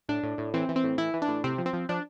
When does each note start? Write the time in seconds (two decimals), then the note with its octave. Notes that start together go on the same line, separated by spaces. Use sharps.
0.09 A2 D4
0.23 A2
0.38 A2
0.54 E3 C4
0.69 E3
0.76 C4
0.84 A2
0.98 E3 E4
1.14 E3
1.22 D4
1.28 A2
1.44 C3 C4
1.58 F3
1.66 C4
1.73 F3
1.89 F3 D4